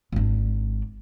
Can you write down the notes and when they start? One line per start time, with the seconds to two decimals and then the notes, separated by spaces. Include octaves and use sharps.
0.12 G#1 D4